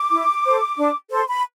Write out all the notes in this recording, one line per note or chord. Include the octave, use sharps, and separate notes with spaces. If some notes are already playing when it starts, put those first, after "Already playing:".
Already playing: D6
E4
A4 C5
D4
A4 C5 C6
B5